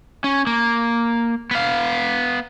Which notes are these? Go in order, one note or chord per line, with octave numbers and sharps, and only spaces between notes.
C#4
A#3
B3 F5